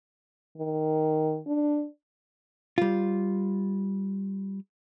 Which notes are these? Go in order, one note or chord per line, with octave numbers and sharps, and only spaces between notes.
D#3
D4
G3 F4